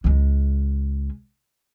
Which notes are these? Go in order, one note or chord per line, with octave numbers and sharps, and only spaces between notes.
C#2 G#3